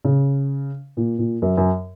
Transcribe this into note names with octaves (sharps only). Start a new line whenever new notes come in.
C#3
A#2
A#2
F#2
F#2